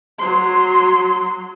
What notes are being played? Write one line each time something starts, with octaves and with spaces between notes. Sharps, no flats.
F#3 C6